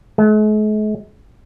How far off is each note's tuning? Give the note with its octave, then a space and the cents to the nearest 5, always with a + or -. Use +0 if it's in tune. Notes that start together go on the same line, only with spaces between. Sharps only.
G#3 +45